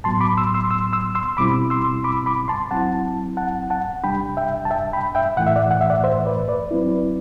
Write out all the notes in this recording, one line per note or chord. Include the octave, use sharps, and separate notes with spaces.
A2 F#3 B3 A5 C6
B5 D6
C6 E6
C6 E6
C6 E6
C6 E6
C6 E6
B2 G3 C4 E4 B5 D6
C6 E6
B5 D6
B5 D6
A5 C6
F#3 C4 E4 F#5 A5
F#5 A5
F#5 A5
C3 G3 D4 G5 B5
E5 G5
A5
E5 G5
G5 B5
E5 G5
A2 E3 A3 F#5
E5
D5 F#5
F#5
E5
D5 F#5
C5 E5
B4 D5
B4 D5
F#3 C4 E4